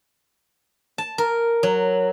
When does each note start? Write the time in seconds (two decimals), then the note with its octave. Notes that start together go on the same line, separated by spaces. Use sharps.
0.98 A5
1.18 A#4
1.63 F#3